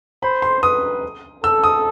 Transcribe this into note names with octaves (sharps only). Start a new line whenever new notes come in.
C5 B5
C6
B4 D#6
A4 E6
D#6